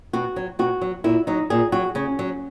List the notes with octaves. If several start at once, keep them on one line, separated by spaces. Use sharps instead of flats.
B2 F#4
F#3
B2 F#4
F#3
A#2 E4
F#3 D#4
A#2 G#4
F#3 F#4
C#3 C#4
F#3